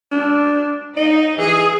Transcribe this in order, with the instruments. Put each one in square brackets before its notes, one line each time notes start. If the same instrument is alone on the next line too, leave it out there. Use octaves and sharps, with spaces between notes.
[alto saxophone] D4
[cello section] D#4 [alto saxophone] D#5
[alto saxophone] E3 [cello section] G#4